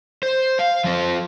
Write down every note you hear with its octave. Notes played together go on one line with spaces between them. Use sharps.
C5
F5
F3 C4